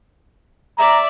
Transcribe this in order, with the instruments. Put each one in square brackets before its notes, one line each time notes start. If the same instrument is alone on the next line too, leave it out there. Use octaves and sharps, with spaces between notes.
[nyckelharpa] D5 E5 [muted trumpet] A#5